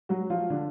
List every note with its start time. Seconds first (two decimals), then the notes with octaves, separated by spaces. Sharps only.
0.09 F#3 F#4
0.30 F3 F4
0.50 D3 D4